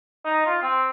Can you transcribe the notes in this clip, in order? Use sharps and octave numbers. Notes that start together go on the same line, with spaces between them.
D#4
F4
C4